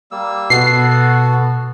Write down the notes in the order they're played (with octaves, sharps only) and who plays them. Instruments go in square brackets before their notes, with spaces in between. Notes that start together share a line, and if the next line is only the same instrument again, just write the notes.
[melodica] G3 A#3 E6
[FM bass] B2 [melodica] B3 F#4 A4 [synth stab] C7